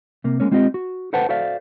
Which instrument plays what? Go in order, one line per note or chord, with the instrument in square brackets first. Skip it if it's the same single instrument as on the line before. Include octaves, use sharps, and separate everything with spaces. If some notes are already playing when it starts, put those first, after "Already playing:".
[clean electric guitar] C3 A#3
G#3 A#3 C#4
G#3 C4 F4 G4 D#5
F#4
A4 B4 C5 F#5 G5 A5
F#4 A4 C5 D5 E5 F5